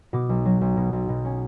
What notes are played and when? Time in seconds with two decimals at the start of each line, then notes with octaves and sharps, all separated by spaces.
0.13 B2 D6
0.29 B1
0.45 F#3
0.61 B1
0.77 B2
0.93 B1
1.09 B2
1.25 C#4